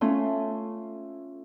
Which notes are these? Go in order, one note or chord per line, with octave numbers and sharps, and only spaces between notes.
A3 C#4 F4